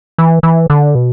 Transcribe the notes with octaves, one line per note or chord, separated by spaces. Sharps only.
E3
E3
D3
B2